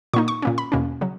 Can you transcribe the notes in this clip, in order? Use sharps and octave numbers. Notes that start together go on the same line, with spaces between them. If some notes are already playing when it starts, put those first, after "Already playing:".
A#2 A#3 D#4 C#6
C#6
A#2 A#3 C#4
B5
E2 B2 A#3 C#4
C#3 F#3